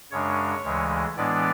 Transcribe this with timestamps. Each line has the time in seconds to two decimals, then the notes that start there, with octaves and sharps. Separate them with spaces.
0.11 F#2 C#3 G#3 D4 C#5
0.64 D2 C#3 E3 G#3
1.16 A2 E3 G#3 B3 D4 D5